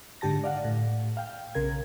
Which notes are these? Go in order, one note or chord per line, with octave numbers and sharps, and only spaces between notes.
G#2 D3 G4 A5 A#6
D5 F5 F#5
A2
F5 G5
B1 C#3 A#4 G#6